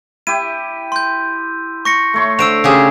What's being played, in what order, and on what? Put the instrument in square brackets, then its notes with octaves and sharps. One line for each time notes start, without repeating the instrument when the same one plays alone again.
[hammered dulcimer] E4 G4 [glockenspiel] D#7
[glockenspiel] C6 G6
C#6 A#6 C#7
[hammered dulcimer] A3 C#5 C6
[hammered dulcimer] D3 [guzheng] C5 [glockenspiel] E6 D7 F7
[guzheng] C#3 G4 G#4